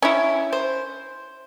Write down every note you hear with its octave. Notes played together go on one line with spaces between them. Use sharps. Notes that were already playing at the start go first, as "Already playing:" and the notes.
C#4 E4
C5